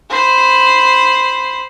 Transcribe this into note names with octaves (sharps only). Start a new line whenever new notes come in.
C5 B5